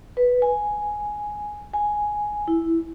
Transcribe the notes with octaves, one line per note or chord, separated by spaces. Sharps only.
B4
G#5
G#5
E4